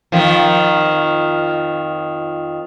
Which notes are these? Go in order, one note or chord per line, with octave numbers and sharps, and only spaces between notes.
F2 D#3 F3